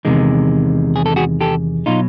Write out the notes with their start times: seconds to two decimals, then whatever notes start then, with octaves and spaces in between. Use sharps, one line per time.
0.05 E2 C3 D#3 G#3
0.96 G#4
1.06 A4
1.16 F#4 G#4
1.41 G4 A4
1.86 B2 F#3 D#4 F4